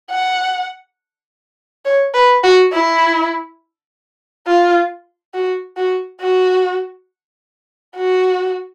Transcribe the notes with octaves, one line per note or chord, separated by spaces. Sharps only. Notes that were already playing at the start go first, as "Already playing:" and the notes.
F#5
C#5
B4
F#4
E4
F4
F#4
F#4
F#4
F#4